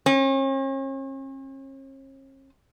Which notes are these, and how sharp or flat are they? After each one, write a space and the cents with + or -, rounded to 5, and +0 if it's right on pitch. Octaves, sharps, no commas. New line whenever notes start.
C#4 -45